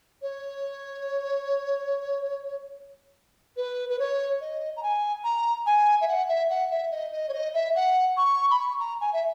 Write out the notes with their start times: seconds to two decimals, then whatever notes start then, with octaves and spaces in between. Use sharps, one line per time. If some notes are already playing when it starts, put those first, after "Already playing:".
0.22 C#5
3.56 B4
3.89 B4
3.99 C#5
4.41 D#5
4.76 A#5
4.83 G#5
5.24 A#5
5.66 G#5
6.01 E5
6.08 F#5
6.28 E5
6.49 F#5
6.70 E5
6.91 D#5
7.12 D#5
7.28 C#5
7.33 D#5
7.54 E5
7.75 F#5
8.17 C#6
8.50 B5
8.58 C#6
8.79 A#5
9.00 G#5
9.13 E5